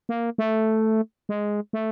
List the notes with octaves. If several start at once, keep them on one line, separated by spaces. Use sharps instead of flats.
A#3
A3
G#3
A3